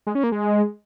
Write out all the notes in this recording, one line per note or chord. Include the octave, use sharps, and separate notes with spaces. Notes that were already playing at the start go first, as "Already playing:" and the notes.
G#3
C#4
A#3
G#3